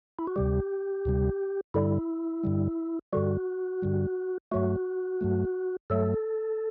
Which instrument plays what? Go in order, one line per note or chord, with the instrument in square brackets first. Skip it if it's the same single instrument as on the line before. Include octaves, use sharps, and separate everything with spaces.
[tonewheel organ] E4
F#4
D2 C3 G3 G4
D2 C3 G3
G2 D3 G3 E4
G2 D3 G3
G2 D3 G3 F#4
G2 D3 G3
G2 F#3 A3 F#4
G2 F#3 A3
G2 F#3 A3 A4